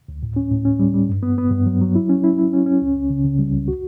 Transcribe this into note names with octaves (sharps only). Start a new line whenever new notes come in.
D2
A2
C#4
A2
C#4
G3
G3
G2
B3
B3
G2
F#3
F#3
E4
C#4
E4
E4
C#4
C#4
C#2
C#2
C#3
C#3
G3
C#2
F#4